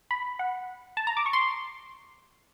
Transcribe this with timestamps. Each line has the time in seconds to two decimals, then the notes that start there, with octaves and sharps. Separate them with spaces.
0.11 B5
0.39 F#5
0.97 A5
1.07 A#5
1.17 D6
1.26 C#6
1.33 C6